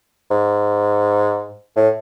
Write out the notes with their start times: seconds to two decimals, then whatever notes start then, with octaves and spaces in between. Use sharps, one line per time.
0.31 G#2
1.76 A2